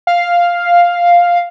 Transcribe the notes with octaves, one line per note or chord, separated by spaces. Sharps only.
F5